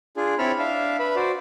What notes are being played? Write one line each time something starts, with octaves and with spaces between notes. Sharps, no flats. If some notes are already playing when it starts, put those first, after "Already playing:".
D4 F4 G#4
C4 E4 C#5 A5 B5 F6
D4 E5 F5
B4 E5 B5
F#4 C5 D5